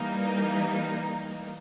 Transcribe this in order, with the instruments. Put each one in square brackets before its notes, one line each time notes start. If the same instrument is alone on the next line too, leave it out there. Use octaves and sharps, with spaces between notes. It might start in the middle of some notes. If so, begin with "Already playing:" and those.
Already playing: [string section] E3 G3 A#3 D#4